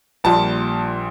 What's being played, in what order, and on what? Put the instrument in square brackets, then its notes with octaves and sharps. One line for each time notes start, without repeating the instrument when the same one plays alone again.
[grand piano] A#1 A#2 G3 A5